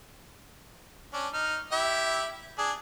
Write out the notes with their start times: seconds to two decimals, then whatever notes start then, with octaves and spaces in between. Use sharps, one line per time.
1.14 C#4 D4
1.34 D#4 F6
1.72 E4 G4 E5
2.58 D4 G#4